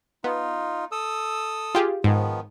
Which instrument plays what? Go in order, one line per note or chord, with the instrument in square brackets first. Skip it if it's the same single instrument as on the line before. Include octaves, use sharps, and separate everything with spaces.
[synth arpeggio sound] B3 [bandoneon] D#4 F4
[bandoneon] A4 D#6 E6
[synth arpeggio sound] F4 G4 G#4
[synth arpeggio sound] G#2 [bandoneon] D#3 F3 B3